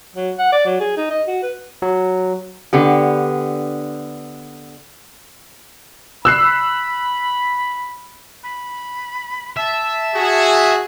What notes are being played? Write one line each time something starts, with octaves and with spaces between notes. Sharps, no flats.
F#3
F#5
D5
F#3
G#4
D#4
D#5
F#4
B4
F#3
D3 B3 G4
B5 E6 F#6 C7
B5
E5 A5
F#4 G#4